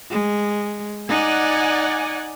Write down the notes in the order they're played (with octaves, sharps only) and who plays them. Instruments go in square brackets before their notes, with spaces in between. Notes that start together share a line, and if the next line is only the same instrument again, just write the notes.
[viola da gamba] G#3
[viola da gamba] D#4 [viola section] D5 F#5 G#5